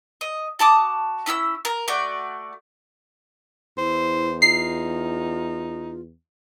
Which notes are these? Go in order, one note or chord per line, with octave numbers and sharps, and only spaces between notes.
D#5
F#4 A5 D6 D#6
C#4 E4 D#6 E6
A#4
A3 F#4 D5
E2 E4 C5
D#4 F4 C7